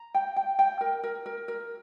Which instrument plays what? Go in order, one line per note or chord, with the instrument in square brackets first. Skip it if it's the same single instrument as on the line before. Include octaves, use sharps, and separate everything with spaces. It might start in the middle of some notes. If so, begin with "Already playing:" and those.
Already playing: [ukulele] A#5
G5
G5
G5
A#4
A#4
A#4
A#4